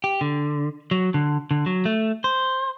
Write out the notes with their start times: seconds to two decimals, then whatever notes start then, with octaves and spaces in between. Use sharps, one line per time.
0.04 G4
0.21 D3
0.91 F#3
1.14 D3
1.51 D3
1.66 F#3
1.85 A3
2.24 C5